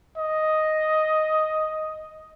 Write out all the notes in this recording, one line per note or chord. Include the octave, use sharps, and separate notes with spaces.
D#5